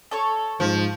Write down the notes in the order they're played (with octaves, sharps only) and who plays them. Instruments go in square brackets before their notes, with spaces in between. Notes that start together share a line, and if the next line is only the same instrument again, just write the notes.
[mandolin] A4 C#5 C#6
[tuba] G#2 [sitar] F3